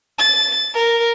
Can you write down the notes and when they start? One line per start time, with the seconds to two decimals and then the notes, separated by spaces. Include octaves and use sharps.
0.19 A6
0.75 A#4